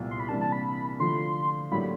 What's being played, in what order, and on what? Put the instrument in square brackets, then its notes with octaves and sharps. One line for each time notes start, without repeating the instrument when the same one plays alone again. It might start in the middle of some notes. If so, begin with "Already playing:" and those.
Already playing: [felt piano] C2 A#2 F3 G#3 B3
[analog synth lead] C6
B5
[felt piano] C3 E3 G3 A#3 D4 [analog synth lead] A5
[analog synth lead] A5
B5
[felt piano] D3 F3 A3 [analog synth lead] C6
[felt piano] A2 F#3 A#3 D4 G4 [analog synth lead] B5